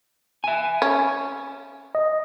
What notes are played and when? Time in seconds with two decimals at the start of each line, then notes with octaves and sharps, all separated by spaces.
0.44 E5 G#5
0.82 C#4
1.95 D#5